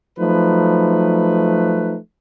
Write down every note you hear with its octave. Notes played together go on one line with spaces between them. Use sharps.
F3 F#3 A3 D#4 B4